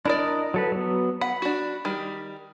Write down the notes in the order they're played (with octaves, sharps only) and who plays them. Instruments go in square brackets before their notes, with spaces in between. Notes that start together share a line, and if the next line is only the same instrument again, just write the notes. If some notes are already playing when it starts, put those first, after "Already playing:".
[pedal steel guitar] D4 A#4 D#5 [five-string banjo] E4 D5
[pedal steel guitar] F#3 A4 B4
F#3 B3
[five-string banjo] F#5 [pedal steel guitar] B5
[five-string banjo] D4 F#4
D#3 G3